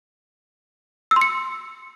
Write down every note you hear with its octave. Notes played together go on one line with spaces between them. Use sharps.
E6
C6
C#7